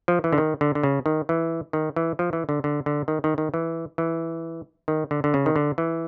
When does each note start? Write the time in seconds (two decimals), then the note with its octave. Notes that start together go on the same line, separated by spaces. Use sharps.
0.08 F3
0.24 E3
0.33 D3
0.38 D#3
0.61 D3
0.75 D3
0.83 C#3
1.06 D#3
1.29 E3
1.73 D#3
1.96 E3
2.19 F3
2.33 E3
2.49 D3
2.64 D3
2.86 D3
3.08 D#3
3.24 D#3
3.38 D#3
3.54 E3
3.98 E3
4.88 D#3
5.11 D3
5.24 D3
5.34 C#3
5.46 D#3
5.56 D3
5.78 E3